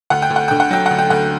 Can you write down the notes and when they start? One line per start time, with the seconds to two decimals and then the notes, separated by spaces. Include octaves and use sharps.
0.10 D2 F#5
0.22 G5
0.30 D2
0.36 F#5
0.48 D3 G5
0.60 F#5
0.71 F#3 G5
0.86 D2 F#5
0.98 G5
1.10 D2 F#5